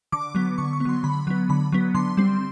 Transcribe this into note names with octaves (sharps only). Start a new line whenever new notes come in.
D3 D6
F#3 B3
D3 C#6
C#6
B3
F#3 C6
D3 B5
F#3 B3
D3 B5
F#3 B3
D3 C6
G3 C4